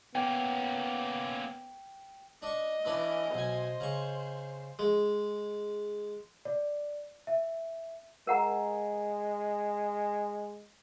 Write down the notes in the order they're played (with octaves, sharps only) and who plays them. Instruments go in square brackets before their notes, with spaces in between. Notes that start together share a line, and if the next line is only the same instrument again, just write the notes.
[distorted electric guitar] A#3 C#4 [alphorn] B3 [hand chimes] G5
[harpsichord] D4 C#6 [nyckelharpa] D#5
[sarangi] E3 [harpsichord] C#4 D4 B4
[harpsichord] B1 G#5 [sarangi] C5
[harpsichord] C#3 C#6
G#3
[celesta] D5
E5
[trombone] G#3 [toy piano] A#4 F#5 A#5